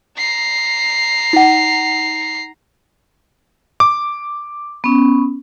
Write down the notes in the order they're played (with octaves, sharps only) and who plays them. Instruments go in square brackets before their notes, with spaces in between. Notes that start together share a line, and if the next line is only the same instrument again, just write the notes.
[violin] A#5 C7
[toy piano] D#4 F#5
[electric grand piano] D6
[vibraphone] B3 C#4